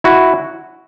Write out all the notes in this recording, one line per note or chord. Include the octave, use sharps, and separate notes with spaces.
E4 F#4